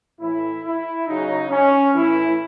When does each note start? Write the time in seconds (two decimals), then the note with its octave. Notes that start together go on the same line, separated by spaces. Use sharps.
0.20 A2 E3 E4
0.64 E4
1.07 C#3 F#3 D#4
1.50 C#4
1.94 A2 E3 E4